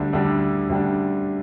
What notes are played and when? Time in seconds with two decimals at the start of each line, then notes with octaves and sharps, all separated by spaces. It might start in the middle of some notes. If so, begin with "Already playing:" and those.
Already playing: D2 D3 G3 D4
0.13 D2 D3 G3 D4
0.70 D2 D3 G3 D4